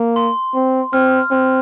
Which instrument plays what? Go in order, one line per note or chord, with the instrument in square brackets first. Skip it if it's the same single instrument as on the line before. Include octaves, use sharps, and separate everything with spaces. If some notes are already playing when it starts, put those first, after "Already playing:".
Already playing: [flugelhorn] A#3
[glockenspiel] C6
[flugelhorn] C4
[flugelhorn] C4 [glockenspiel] F6
[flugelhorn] C4